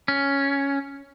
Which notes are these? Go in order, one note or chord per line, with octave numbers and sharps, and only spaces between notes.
C#4